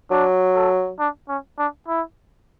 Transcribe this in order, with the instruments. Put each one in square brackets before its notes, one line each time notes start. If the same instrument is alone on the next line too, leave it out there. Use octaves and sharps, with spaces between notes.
[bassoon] F#3 [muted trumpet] D4
[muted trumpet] A4
D4
C#4
D4
E4